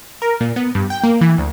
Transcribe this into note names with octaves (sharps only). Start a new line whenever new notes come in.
A#4
A#2
B3
G2
G5
A#3
E3
D2